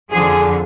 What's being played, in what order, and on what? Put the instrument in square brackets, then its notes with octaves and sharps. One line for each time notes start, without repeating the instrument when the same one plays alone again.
[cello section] F2 D3 F3 G#4